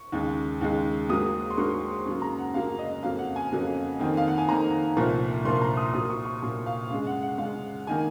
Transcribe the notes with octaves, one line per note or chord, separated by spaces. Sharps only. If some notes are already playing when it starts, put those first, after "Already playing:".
Already playing: C#6
D#2 C#3 G#3
D#2 C#3 G#3
G#2 F#3 A#3 D#6
C6
G#2 F#3 A#3 C#6
F#2 C#3 F#3 A#3
A#5
F#5
F#2 C#3 F#3 A#3 F5
D#5
F2 C#3 F#3 A#3 F5
F#5
G#5
F2 C#3 F#3 A#3
F2 D#3 A#3
F5
F#5
G#5
F2 D#3 A#3 A#5
C2 A#2 F3 A#3 C#6
C2 A#2 F3 A#3 C6
A#5
D#6
A#2 F#3 A#3 D#6
C#6
C#6
A#2 F#3 A#3
F5
F#2 C#3 G#3 F5
F#5
F#5
F#2 C#3 G#3 F5
D#3 A#3 G#5